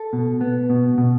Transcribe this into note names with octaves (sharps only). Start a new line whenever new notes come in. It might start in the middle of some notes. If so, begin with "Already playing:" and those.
Already playing: A4
B2
B3
B2
B2